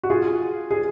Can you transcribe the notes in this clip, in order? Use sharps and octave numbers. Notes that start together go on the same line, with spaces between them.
F#4
F4 G#4
G#4